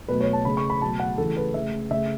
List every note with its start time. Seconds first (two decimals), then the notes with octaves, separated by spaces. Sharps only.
0.08 B2 F#3 A3 B4
0.21 C#5
0.33 A5
0.45 C#3 A3 B5
0.57 C#6
0.70 B5
0.82 B2 F#3 A3 A5
1.00 F#5
1.18 C#3 E3 A3 A4
1.37 B4
1.54 C#3 A3 E5
1.91 C#3 A3 E5